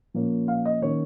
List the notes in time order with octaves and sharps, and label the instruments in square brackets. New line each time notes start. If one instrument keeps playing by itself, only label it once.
[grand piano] A#2 F3 A#3 C#4
F5
D#5
D#3 A#3 C#4 C#5